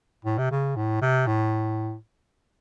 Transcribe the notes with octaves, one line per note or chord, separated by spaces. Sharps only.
A2
C3
C#3
A2
C3
A2